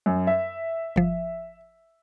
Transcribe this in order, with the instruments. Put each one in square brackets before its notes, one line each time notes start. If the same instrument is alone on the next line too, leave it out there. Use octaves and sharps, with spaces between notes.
[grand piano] F#2
E5
[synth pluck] G1 F3